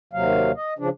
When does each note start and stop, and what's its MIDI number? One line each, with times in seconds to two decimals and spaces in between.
0.13 0.52 39
0.13 0.52 48
0.13 0.52 54
0.13 0.52 77
0.57 0.74 75
0.79 0.89 49
0.79 0.89 53
0.79 0.89 62